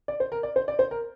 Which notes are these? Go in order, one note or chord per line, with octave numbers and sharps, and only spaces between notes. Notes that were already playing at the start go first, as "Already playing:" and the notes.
D5
C5
A#4
D5
C5
D5
C5
A#4